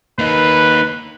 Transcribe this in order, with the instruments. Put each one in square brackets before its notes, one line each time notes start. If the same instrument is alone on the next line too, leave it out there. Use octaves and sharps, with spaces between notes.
[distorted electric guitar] A#3 D#4 [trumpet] B4